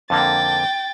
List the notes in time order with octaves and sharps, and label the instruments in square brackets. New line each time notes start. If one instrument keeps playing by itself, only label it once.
[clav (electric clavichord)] F2 D3 A#3 [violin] G5 A6